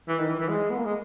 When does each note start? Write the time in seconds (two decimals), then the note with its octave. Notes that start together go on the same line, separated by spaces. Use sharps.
0.08 E3
0.19 D#3
0.29 E3
0.40 E3
0.49 G#3
0.70 B3
0.77 A#3
0.85 G#3